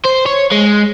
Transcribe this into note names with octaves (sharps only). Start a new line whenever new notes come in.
C5
C#5
G#3